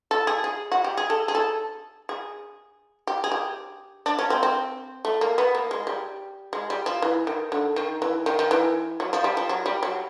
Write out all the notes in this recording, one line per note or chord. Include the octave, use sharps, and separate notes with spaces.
A4
G#4
G#4
F#4
G4
G#4
A4
G#4
A4
G#4
G4
G#4
G4
D4
C#4
C4
C4
A3
A#3
B3
A#3
G#3
G3
G#3
G3
F3
E3
D#3
D3
D#3
E3
D#3
D#3
E3
F#3
F3
G3
F3
F#3
G3
F#3